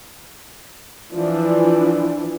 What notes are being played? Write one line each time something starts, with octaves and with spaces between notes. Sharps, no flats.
E3 F3 D4